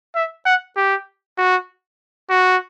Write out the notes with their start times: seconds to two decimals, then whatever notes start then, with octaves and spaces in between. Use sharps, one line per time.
0.15 E5
0.46 F#5
0.77 G4
1.38 F#4
2.30 F#4